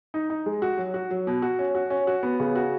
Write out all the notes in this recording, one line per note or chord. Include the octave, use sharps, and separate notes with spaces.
D#4
D#4
G#3
F#4
F#3
F#4
F#3
B2
F#4
C#4
F#4
C#4
F#4
B3
C#3
F#4